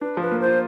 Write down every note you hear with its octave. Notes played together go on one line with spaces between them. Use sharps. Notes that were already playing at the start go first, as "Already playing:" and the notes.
D4 B4
F3 B4
A#3
C5
F4